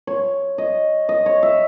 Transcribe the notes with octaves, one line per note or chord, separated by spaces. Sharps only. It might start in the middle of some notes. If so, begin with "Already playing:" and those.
C#5
D#5
D#5
C#5
E5